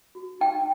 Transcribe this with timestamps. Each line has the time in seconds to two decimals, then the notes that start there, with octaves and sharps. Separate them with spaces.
0.15 F#4
0.41 D#4 G5